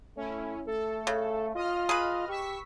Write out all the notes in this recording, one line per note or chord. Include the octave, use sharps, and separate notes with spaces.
A3 C#4 E4
A3 A4
C#3
F4 D#5 F6
G#4 B4
G4 C#6 E6 B6